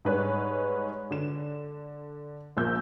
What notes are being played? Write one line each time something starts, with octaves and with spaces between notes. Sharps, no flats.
G#2 G3 D#4 B4 C#5 F#6
D3 E7
A#1 F3 A#3 E6 G6